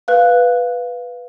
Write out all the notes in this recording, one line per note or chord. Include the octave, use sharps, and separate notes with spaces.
B4 F5 F#6